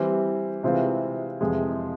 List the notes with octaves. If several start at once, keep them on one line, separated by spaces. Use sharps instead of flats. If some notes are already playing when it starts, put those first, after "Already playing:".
Already playing: E3 G3 C4
C3 E3 G#3 C4 F4
F2 C3 E3 G#3